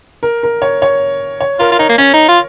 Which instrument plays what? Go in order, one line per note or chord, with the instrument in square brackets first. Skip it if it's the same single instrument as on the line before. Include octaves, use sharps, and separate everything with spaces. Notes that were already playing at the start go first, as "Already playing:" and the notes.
[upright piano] A#4
A#4
C#5
C#5
C#5
[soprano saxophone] F4 [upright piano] A#4
[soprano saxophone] F4
[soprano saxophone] D#4 [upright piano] C#5
[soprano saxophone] A#3
[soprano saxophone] C#4 [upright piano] C#5
[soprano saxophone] D#4
F4